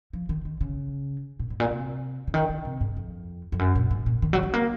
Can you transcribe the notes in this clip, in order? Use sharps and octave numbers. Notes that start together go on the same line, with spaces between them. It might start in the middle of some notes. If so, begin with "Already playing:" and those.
F3
D#3
D#3
C#3
A#2
G#2
A#2
C3
C#3
D#3
C#3
C3
G#2
F2
F2
F#2
A#2
G#2
A#2
D#3
F#3
G#3
A#3